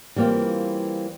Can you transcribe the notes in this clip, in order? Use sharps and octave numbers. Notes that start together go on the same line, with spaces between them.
E3 G3 A#3 C4 F4